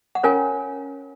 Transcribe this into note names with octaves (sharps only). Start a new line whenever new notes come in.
F#5
C#4 F4 A#4 C#5 G#5